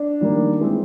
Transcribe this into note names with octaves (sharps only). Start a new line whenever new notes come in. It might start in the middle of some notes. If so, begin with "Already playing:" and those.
Already playing: D4
D#3 G3 A#3
E3 G#3 C4